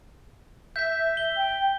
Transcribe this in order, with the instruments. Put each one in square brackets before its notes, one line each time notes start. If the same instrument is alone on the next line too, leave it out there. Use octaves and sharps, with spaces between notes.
[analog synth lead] E5 [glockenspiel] G6 B6
[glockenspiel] G7
[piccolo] G5